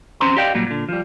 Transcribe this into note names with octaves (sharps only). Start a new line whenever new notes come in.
F2 C4 C#4 C5 A#5 C6
G4 D5 D#5 F5 G5
A#2 F#3 G3 A#3
A#2 D3
F3 G3